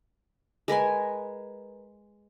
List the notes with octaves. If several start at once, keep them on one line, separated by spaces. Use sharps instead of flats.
G#3 A#4 B4 G#5